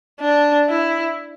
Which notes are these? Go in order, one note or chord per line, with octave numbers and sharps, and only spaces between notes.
D4
E4